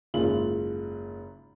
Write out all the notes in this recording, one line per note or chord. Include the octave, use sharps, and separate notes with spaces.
F#1 G#2 F4 F#7